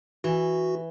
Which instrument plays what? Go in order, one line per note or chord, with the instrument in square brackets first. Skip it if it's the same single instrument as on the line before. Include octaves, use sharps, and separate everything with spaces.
[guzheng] E3 [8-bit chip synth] F#4